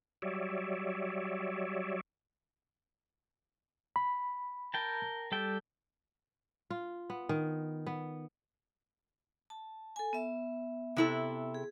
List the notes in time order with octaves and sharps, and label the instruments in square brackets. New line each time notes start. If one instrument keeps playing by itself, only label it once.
[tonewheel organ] F#3 G3 C#5 D5 E5
[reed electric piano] B5
[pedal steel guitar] A#4 G5 A5
G3 A4 G5
[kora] F4
B3
D#3
B3
[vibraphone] A5
A4 G#5
B3 E5
[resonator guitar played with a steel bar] C3 E4 A4
[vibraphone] G#4